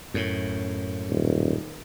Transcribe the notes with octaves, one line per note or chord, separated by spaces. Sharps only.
F#2 A2
D#1